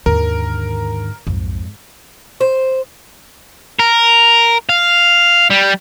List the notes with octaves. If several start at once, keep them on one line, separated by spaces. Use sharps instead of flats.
D#2 G#2 D3 A#4
B1 F2 G#2
C5
A#4
F5
G3